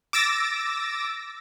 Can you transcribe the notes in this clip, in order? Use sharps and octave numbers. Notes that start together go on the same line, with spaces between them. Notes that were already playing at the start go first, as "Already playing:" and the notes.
D6 E6 A6 A#6